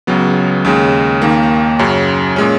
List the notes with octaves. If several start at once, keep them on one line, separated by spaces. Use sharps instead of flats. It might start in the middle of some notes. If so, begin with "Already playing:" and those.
C#2 C#3 F#3 B3
D#2 C#3 G#3
D#2 D#3 A#3
F#2 C#3 F#3
A#2 G#3 C#4